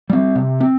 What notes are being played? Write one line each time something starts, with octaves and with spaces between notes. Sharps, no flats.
G3 C4
C3
C4